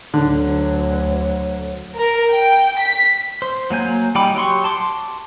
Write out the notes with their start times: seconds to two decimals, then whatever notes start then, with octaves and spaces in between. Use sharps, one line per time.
0.14 D2 D3 F#3
1.96 A#4
2.32 G5
2.79 B6
3.42 C5
3.70 F#3 A#3 G#5 G6
4.15 G3 D#4 G5 B5 D6
4.35 F#3 G4 C6 C#6
4.64 A5 C6 D6